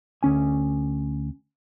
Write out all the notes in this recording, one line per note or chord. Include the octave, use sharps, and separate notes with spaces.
D2 C#4 G#5